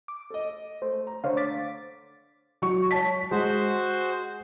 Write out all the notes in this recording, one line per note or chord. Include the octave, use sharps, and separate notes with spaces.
D6
A4 D#5
A3 C5
A#5
D3 A3 C5 C#5 F5
D6 A6 B6
F#3 C#6
C#5 A5 B6
G#3 F#4 C5